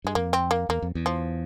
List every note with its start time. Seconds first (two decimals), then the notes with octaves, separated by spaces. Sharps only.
0.04 G2 G#3
0.15 F2 A#3
0.33 C4
0.51 A#3
0.69 E2 A#3
0.82 F2
0.95 E2
1.06 F3